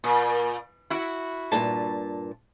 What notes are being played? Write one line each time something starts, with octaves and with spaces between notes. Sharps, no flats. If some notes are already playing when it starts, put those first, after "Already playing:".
A#2
E4 F#4
G2 A#2 A5